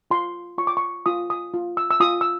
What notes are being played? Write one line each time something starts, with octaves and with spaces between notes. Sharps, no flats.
F4 C6
F4 C#6
D6
C#6
F4 D#6
D#6
F4
E6
E6
F4 D#6
E6